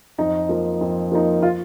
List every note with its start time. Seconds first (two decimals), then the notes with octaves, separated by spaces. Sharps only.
0.18 F2 D#4
0.49 F3 A#3 D#4
0.81 F2
1.12 F3 A#3 D#4
1.42 F4